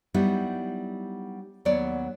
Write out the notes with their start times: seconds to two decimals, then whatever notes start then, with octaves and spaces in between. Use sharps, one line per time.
0.14 F#3 G3 B3 D#4 E4
1.65 D#2 F#3 B3 C#5 D5